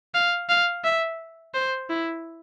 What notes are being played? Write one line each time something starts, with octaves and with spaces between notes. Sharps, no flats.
F5
F5
E5
C5
E4